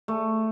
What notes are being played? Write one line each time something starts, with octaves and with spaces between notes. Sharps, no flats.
A3